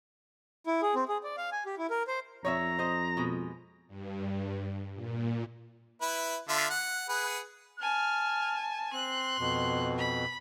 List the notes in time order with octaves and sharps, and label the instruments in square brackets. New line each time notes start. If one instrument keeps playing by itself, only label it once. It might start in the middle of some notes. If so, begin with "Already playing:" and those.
[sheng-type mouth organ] E4
G#4
C4
G#4
D5
F5
G#5
G4
E4
A#4
C5
[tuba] F2 [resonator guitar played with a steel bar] C#5 D#5 E5 [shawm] A#5
[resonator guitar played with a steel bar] C5 D#5
B2 G#3
[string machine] G2
A#2
[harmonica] E4 B4
D3 F4 E5
F#5
G#4 B4 F#5
[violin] G#5 A5 [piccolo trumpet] F6
[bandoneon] C4 [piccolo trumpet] C6 [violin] F#6
[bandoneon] F2 B2
[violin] B5